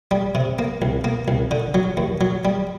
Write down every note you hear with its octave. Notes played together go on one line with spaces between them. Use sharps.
G3
C3
A#3
C2
A#3
C2
D3
F#3
D#2
F#3
G3